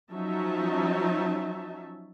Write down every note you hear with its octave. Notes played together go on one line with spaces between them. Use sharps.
F3 F#3 C#4 D#4 E5 A5